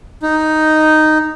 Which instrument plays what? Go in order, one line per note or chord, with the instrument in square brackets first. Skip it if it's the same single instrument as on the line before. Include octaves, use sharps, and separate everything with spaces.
[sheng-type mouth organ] D#4